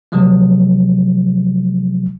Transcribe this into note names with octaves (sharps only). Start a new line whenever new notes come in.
C3 F3 F#3 G#3 A3